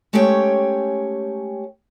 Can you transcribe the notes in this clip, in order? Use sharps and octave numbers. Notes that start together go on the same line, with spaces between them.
G#3 A3 C#4 G4 C#5 G5